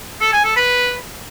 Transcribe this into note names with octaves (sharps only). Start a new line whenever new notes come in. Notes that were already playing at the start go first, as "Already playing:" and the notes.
A4
G#5
A4
B4